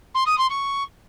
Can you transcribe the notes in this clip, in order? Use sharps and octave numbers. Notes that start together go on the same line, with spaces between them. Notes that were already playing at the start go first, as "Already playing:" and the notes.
C6
D#6
C6
C#6